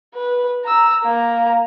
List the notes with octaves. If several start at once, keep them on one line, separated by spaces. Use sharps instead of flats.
B4
A#5 E6
A#3 A#5